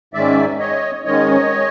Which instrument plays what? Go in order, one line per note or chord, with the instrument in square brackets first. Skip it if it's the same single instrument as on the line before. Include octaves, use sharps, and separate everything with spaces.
[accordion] G#2 D#3 G#3 C#4 D5 E5
C#5 D#5
G#2 D#3 G#3 C#4 C#5 D#5